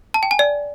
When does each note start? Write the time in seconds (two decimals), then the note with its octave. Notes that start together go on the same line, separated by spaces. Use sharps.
0.14 A5
0.23 G5
0.31 G#5
0.39 D5